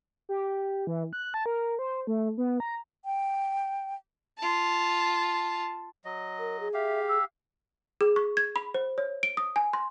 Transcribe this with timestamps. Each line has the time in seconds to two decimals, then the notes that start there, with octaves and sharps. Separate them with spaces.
0.29 G4
0.87 E3
1.13 F#6
1.34 A5
1.46 A#4
1.79 C5
2.07 A3
2.38 B3
2.60 A#5
3.05 G5
4.38 F4 A5
6.05 F#3 D#5
6.39 A#4
6.60 G#4
6.74 G4 E5 F5
7.09 E6
8.01 G#4
8.16 C#6
8.37 G#6
8.56 B5
8.74 C5
8.98 C#5
9.23 D7
9.37 D#6
9.56 G#5
9.73 C6